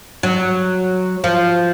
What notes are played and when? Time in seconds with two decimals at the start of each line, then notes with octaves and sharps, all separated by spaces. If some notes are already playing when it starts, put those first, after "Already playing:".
0.23 F#3
1.24 F3